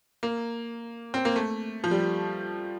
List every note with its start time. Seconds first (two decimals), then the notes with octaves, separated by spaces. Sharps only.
0.23 A#3
1.14 C4
1.25 A#3
1.36 A3
1.84 F3
1.91 G3